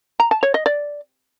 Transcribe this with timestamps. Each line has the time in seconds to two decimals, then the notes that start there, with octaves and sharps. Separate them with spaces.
0.20 A#5
0.31 A5
0.43 C#5
0.54 D#5
0.66 D5